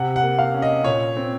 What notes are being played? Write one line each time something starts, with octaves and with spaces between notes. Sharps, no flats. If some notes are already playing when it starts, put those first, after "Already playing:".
Already playing: C3 F#5
F#5
A#3
F5
C#4
D#5
A#2 C#5
C4